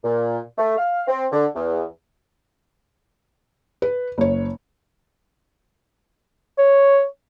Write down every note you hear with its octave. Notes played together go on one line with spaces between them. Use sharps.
A#2
A3
F5
C4
D3
E2
B4
F#1 C#5
C#5